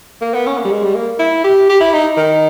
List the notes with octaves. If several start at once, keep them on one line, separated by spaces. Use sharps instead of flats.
A#3
B3
C#4
A#3
G3
G#3
G3
A#3
E4
G4
G4
E4
D#4
D#3